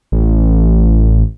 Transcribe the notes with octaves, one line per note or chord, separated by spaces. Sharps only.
A1